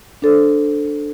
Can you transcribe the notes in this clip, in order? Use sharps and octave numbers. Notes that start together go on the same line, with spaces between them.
D4 A4 C5